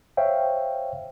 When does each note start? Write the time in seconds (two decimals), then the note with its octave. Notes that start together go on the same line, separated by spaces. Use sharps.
0.17 C5 C#5 E5 F5 G5